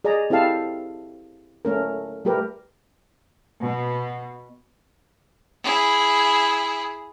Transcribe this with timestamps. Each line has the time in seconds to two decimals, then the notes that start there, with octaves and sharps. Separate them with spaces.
0.04 G#4 D5 D#5 A#5
0.30 C4 E4 G4 A4 F5 A5
1.65 A3 C#4 A#4
2.25 G3 A3 G4 A#4 B4
3.62 B2
5.64 E4 G#4